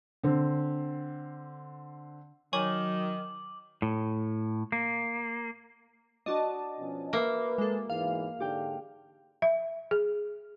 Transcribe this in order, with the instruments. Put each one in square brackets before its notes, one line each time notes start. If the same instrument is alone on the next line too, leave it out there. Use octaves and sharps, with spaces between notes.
[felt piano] D3 C4
[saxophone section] D#3 [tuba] F#3 [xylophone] C#5 G#5 C#6 [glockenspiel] D6 F#7
[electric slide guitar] A2
A#3
[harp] D4 F#4 D5 [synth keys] D#5 A5
[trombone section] B2 F3 C#4
[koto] A#3 [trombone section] B4 [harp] E5
[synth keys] G#3 A4
[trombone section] E2 G#2 E3 [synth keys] F5
[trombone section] G#2 D3 [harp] G4 G5
[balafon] E5
G#4